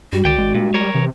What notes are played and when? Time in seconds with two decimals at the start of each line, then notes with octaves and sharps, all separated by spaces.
0.13 G2 G3 F#4
0.25 C#2 D#3 D5 G5
0.39 G#1 G#3
0.55 G2 A#2
0.74 G3 A#4 C#5
0.95 C3 E3